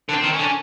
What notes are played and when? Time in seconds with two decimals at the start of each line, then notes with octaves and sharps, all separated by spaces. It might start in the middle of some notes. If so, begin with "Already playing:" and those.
0.09 D3
0.14 C4
0.23 D#3
0.34 C#4
0.39 D3